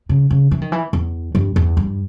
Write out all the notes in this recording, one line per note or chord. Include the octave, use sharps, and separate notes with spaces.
C#3
C#3
E3
D#3
E3
E2
G2
E2
G2